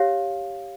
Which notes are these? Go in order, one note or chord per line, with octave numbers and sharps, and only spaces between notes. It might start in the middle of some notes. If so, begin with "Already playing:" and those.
Already playing: G4 C#5 F5